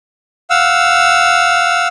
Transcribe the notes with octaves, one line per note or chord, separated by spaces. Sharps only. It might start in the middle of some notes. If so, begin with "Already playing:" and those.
F5 F#5 E6